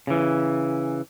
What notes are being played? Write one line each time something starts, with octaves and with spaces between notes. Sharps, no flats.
C#3 E3